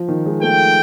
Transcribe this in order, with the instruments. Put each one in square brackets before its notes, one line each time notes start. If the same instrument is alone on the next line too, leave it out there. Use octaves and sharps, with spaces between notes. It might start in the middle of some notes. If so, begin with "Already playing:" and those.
Already playing: [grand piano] F3
D#3
G#3
[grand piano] A3 [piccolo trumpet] G5